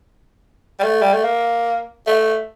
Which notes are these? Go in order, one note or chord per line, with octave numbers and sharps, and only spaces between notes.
G3
A3
G3
A3
A#3
A3